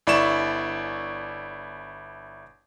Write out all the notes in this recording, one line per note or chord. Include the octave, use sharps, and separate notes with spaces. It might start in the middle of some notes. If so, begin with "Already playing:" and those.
G1 E4 D5 C#6 E7